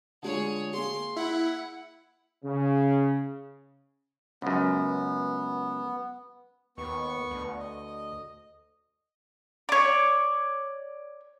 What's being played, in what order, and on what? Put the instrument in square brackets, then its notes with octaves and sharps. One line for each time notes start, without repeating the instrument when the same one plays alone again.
[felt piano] D3 G#3 F4 [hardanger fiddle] G#4 C#5
[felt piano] A#3 G#4 [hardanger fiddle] C6
[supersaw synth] E4 [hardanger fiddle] F#5
[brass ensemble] C#3
[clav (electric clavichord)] C#2 F#2 [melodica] B3
[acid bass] D#2 [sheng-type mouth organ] B3 C#6
[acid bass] D2
[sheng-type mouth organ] D#5
[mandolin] C#5 D5